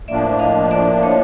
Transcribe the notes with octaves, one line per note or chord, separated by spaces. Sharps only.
A2 F3 A#3 D4 D5 E5
D#5 F5
D5 E5
C#5 D#5